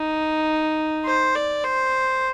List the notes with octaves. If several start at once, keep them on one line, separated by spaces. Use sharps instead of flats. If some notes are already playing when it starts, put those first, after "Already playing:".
Already playing: D#4
C5
D5
C5